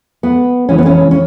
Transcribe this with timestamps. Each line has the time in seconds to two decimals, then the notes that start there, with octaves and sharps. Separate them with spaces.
0.23 B3
0.69 C#3 E3 G#3 C#4
0.78 B3
0.86 C#4
1.11 C#4